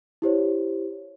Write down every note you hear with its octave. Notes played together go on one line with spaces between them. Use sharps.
E4 G4 C5 C#5